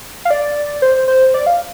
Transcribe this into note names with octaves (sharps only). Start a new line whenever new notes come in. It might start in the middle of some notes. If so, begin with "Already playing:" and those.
F5
D5
C5
C5
D5
F5